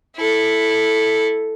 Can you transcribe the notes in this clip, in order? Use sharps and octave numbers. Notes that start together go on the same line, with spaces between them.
E4 A4